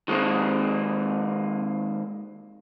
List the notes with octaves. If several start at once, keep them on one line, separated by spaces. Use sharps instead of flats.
D#3 G#3 A#3 C4